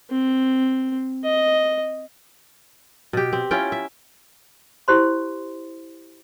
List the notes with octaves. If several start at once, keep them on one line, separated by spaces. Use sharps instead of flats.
C4
D#5
B2 G4
C4
C#4 E4 F4 G5
E5
E4 G4 C5 C6